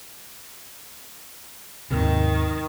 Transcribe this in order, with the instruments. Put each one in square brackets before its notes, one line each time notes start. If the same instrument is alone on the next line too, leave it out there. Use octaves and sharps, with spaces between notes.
[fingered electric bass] D#2 G#2 C3 [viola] D#3